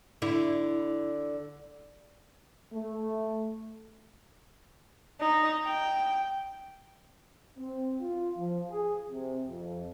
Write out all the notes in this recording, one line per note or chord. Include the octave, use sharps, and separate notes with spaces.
D3 E4
A3
D#4
G5
C4
F4
F3
G#4
C3
F2